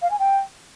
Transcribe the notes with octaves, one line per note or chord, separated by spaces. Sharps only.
F5
G#5
G5